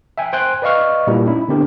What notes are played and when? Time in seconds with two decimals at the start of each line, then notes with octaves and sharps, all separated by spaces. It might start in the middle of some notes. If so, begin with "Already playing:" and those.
0.18 E5 G5 G#5
0.33 C5 G5 G#5 C6 F#6
0.62 B4 D5 D#5 F5 C#6 F6
1.07 A#2 G3 E4 G4 A#4
1.26 C#4 D#4 E4
1.48 D3 B3 C4 D4 G4 A#4